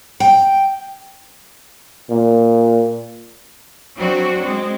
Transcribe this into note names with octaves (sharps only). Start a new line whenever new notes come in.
G5
A#2
F#3 C4 D4 F#4
G#3 C4